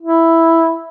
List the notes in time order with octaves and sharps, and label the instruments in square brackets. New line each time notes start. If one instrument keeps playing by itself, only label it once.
[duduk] E4